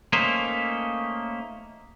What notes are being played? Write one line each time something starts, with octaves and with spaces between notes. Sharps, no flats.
A3 A#3 C#4 D#4 C5 E5